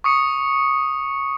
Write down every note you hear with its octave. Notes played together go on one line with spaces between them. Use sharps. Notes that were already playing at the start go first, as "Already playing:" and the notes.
C#6 D#6 C#7